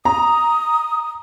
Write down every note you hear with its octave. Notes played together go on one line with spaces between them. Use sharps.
A#5 D#6